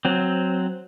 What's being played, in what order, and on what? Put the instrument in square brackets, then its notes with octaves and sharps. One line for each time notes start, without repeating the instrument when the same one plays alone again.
[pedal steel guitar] F#3 C4